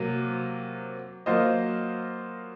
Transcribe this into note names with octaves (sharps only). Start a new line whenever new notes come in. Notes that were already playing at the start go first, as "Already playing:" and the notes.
Already playing: C3 F#3 A#3
F#3 A#3 F4 C5 D#5